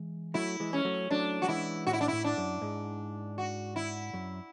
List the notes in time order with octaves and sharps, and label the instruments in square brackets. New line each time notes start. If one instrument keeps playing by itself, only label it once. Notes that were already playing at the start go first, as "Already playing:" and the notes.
Already playing: [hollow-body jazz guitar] E3 G#3
[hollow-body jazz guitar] F#3 A3 [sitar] E4
[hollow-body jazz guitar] E3 G#3
[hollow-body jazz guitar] G#3 [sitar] C#4
[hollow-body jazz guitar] F#3 A3
[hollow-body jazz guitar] F#3 A3 [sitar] D4
[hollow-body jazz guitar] F#3 [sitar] F#4
[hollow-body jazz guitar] E3 G#3 [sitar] E4
[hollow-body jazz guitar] A2 [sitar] F#4
[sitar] E4
D4
[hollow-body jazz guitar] A2 [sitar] E4
[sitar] D4
[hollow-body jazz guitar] F#2
G#2
[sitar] F#4
E4
[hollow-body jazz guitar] F#2